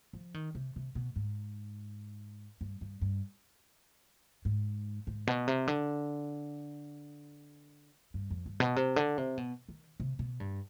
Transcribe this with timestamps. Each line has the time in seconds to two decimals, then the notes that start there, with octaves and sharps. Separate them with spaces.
0.13 F3
0.34 D#3
0.55 C3
0.76 C3
0.95 B2
1.16 G#2
2.61 G2
2.81 G2
3.01 G2
4.45 G#2
5.07 G#2
5.27 B2
5.48 C3
5.67 D3
8.14 G2
8.30 F2
8.46 G2
8.60 B2
8.76 C3
8.96 D3
9.18 C3
9.37 B2
9.69 D#3
10.00 C3
10.19 B2
10.40 G2